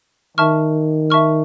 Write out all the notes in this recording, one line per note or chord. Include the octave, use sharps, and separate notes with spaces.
D#3 E5 A5 C#6 F6
E5 A5 C#6 F6